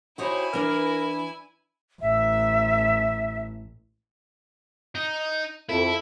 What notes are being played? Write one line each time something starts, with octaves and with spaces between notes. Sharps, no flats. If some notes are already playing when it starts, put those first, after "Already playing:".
D#4 E4 F#4 G4 C5 C#5 G#5
E3 D4 A#4
A1 E5
D#4
F2 E4 A4